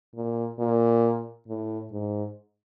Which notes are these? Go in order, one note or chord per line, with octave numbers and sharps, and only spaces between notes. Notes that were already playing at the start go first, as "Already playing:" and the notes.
A#2
A#2
A2
G#2